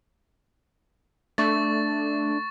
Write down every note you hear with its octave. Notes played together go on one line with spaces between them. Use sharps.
A3 D4 C#6 A6